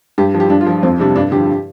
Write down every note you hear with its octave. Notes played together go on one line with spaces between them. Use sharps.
G2 G4
F3
G4
G2 D4
F4
F3
F2 C4
C3 G3 D4
G2 D4
D3 F3 G4